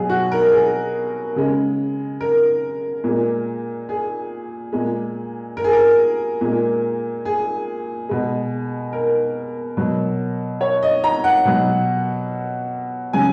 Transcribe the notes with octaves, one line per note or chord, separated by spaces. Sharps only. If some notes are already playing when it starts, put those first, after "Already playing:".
Already playing: B2 F#3 G#4
F#4
A#4
G#4
C#3 G#3
A#4
A#2 G#3
G#4
A#2 G#3
A#4
G#4
A#4
A#2 G#3
G#4
B2 G#3
A#4
B2 F#3
C#5
D#5
A#5
F#5
B2 F#3
C#3 F#3 G#5